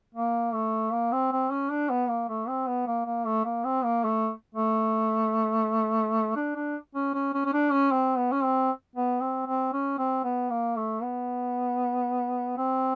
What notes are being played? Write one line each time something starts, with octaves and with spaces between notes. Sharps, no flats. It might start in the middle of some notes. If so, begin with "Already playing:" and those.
A#3
A3
A#3
C4
C4
C#4
D4
B3
A#3
A3
C4
B3
A#3
A#3
A3
A#3
C4
A#3
A3
A3
D4
D4
C#4
C#4
C#4
C#4
D4
C#4
C4
B3
C#4
C4
B3
C4
C4
C#4
C4
B3
A#3
A3
B3
C4